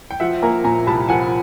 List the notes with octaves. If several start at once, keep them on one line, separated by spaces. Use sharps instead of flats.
G5
F3 E5 F#5
A#3 G#5 A#5
A#2 G#5 A#5
C2 A5 B5
F3 F#5 G#5